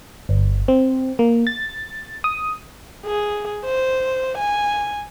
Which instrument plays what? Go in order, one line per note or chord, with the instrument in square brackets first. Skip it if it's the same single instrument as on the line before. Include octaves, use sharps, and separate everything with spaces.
[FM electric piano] G1
C4
A#3
A6
D#6
[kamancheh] G#4
C5
G#5